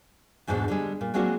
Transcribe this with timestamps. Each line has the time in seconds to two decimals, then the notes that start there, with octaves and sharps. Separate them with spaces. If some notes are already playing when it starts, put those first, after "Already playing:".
0.47 E2 G#2 B2 D4 B4 C5
0.68 D3 G3 G#3
1.01 A#2
1.14 F#3 G#3 A#3 C4 D4 F#4